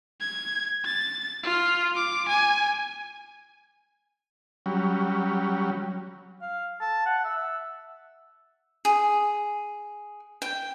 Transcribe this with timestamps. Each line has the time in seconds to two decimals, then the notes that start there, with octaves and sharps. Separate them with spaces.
0.21 G#6
0.85 A6
1.43 F4
1.96 D6
2.28 G#5
4.66 F#3 G3 C#4
6.42 F5
6.81 A5
7.06 F#5
7.24 E5
8.85 G#4
10.42 G5